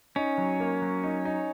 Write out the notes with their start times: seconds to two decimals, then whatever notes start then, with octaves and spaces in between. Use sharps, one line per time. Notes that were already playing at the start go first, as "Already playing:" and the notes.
0.16 C#4 D#4
0.38 F#3
0.60 A#3
0.82 F#3
1.03 D#4
1.25 D#4